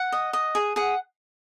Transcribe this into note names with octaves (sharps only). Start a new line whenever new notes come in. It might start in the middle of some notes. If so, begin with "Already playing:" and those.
Already playing: F#5
D#5
D#5
G#4
G#4 F#5